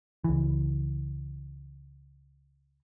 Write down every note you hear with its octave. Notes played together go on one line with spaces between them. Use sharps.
C#2 E3